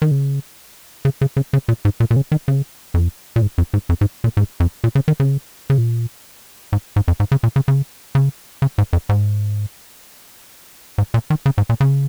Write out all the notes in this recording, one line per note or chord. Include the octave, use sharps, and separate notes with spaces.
D#3
C#3
C#3
C#3
C#3
C#3
A#2
G#2
A#2
A#2
C#3
D#3
C#3
F2
A#2
G#2
F2
G#2
F2
G#2
A#2
G#2
F2
A#2
C#3
D#3
C#3
C#3
A#2
G#2
G#2
F2
G#2
C#3
A#2
C#3
C#3
C#3
C#3
G#2
F2
G#2
G#2
A#2
D#3
C#3
G#2
A#2
C#3